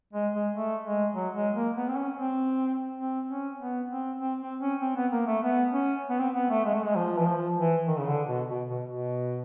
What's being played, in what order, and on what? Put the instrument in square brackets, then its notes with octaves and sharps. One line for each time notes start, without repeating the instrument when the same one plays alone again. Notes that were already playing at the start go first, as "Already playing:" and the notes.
[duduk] G#3
G#3
A3
G#3
F#3
G#3
A#3
B3
C4
C#4
C4
C4
C#4
B3
C4
C4
C4
C#4
C4
B3
A#3
A3
B3
C#4
B3
C4
B3
A3
G#3
A3
G#3
F3
E3
F3
E3
D#3
C#3
D3
B2
B2
B2
B2